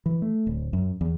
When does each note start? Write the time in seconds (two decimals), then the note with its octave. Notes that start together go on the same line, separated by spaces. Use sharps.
0.06 E3
0.22 A3
0.47 D1
0.73 F#2
1.01 E2